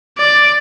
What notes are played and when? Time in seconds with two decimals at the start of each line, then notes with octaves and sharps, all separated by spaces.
0.18 D5